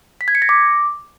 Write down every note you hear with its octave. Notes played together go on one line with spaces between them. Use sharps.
B6
G#6
C#7
A#6
D6